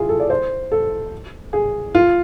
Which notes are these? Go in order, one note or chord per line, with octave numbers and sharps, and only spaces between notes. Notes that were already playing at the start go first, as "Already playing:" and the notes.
Already playing: E4 F4 G#4
A4
D5
C5
A4
G#4
F4